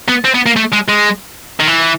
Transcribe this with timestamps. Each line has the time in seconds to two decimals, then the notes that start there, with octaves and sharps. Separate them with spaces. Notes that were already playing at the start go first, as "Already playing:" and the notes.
0.09 B3
0.25 C4
0.35 B3
0.46 A#3
0.56 A3
0.72 G#3
0.88 G#3
1.60 D#3
1.67 E3